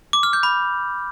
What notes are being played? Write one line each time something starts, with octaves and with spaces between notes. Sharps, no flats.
D6
F6
G6
B5